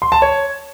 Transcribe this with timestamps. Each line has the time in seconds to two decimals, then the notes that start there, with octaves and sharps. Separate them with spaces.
0.02 C6
0.12 A5
0.22 C#5